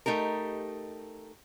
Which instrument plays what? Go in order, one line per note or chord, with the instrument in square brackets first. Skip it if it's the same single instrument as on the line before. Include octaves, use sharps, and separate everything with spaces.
[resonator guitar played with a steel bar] A3 D#4 G4 A#4